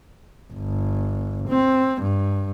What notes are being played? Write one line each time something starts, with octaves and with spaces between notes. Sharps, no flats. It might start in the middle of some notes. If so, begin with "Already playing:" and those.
G1
C4
G2